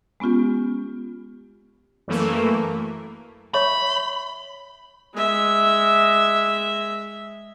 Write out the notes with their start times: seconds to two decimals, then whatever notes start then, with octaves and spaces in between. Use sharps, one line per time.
0.20 G#3 B3 C#4 F4 G4
2.08 F#2 E3 A3 A#3
3.54 C#5 E5 B5 C#6
5.14 G#3 E5